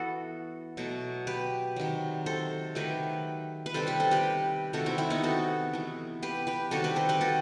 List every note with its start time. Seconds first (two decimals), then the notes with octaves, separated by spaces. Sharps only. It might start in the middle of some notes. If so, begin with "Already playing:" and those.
Already playing: E3 B3 F#4 A4
0.77 B2 F#3 A3
1.27 G4 B4
1.76 C3 D#3 F#3
2.26 A4 C5
2.75 D#3 F#3 A3 G4 B4
3.66 B4
3.74 C3 D#3 G3 A4 C5
3.87 G4 B4
4.00 A4 C5
4.11 G4 B4
4.73 C3 D#3 A3 F#4 A4
4.86 C4 E4
4.98 C4 E4
5.10 B3 D#4
5.24 F#4 A4
5.73 E3 A3
6.23 G4 B4
6.47 G4 B4
6.71 C3 D#3 G3 F#4 A4
6.84 G4 B4
6.96 A4 C5
7.09 G4 B4
7.21 F#4 A4